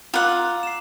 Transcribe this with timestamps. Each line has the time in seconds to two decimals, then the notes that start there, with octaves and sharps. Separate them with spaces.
0.14 F4 F#5 A#5 D6 E6
0.63 C7 E7